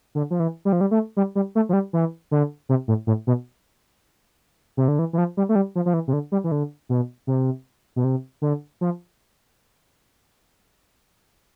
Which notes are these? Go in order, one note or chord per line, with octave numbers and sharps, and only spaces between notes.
D3
F3
E3
G3
F3
G3
A3
G3
G3
A3
F3
G3
E3
D3
C3
A2
A2
B2
C3
D3
E3
E3
F3
G3
A3
G3
F3
F3
E3
C3
D3
G3
E3
D3
B2
C3
B2
C3
D3
F3